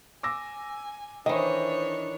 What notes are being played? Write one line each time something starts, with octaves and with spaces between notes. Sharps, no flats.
G#5 D6 E6 A#6
D#3 E3 D4 C5 C#5 D#5